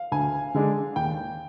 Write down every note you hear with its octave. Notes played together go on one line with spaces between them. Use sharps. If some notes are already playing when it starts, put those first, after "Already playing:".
Already playing: F5
D2 G#5
D3 G#3 D4
D#2 G5